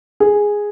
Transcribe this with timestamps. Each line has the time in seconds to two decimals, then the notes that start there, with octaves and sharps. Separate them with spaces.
0.20 G#4